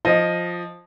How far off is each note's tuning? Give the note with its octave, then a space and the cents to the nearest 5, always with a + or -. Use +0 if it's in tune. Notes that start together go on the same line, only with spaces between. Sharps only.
F3 +5 D#5 +0